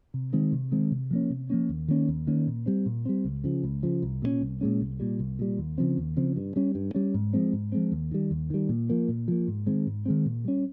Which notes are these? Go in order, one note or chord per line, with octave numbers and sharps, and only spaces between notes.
C3
D#3 G#3 C4
C3
D#3 G#3 C4
C3
F3 A#3 C#4
C3
F3 A#3 C#4
D#2
D#3 A#3 C#4
D#2
D#3 A#3 C#4
A#2
G3 C4
A#2
G3 C4
C#2
C#3 F3
C#2
C#3 F3
C2
A#2 G#3 C#4
C2
A#2 G#3 C#4
C2
A#2 G3
C2
A#2 G3
D#2
C#3 F3 C4
D#2
C#3 F3 C4
G2
G3 C#4
G2
G3 C#4
G#2
F3 G#3 C4
G#2
F3 G#3 C4
D#2
D#3 G3
D#2
D#3 G3
A#2
F3 A#3
A#2
F3 A#3
G#2
D#3 G#3 C4
G#2
D#3 G#3 C4
A#2
G3 C#4